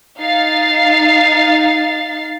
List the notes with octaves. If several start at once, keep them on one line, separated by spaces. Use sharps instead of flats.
D#4 F5 A6 C7